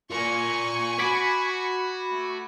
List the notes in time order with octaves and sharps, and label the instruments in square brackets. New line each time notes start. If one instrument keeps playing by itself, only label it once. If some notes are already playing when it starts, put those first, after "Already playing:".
[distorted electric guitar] A#3 F4 [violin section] G#5 C#6
[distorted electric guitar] F#4 [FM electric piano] B5 D6 G#6
[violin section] A3